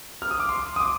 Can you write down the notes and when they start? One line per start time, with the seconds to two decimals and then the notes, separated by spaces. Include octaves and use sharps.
0.22 F6
0.31 D#6
0.40 D6
0.49 C6
0.76 D#6
0.80 D6